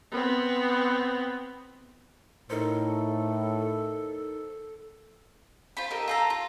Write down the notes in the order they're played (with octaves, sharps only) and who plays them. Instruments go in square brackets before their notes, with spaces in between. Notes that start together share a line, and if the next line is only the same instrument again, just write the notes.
[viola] B3 C4
[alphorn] A2 [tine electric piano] D#4 A#4 C5 [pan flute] A4
[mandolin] F4 C5 B5
D#4 G4 A4 A#4
F4 A4 A#5
F4